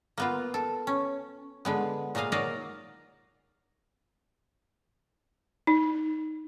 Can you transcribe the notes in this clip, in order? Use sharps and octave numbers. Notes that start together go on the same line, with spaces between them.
A#3 B3 F4
A4
C#4
D3 G#3 B3
A#2 G#3 A#3 D#5 F5
F#3 A#3 D#4 D5 D#5 F5
D#4